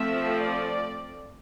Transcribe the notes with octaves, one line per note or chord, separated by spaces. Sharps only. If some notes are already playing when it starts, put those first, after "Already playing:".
Already playing: F3 A3 C4 E5
D5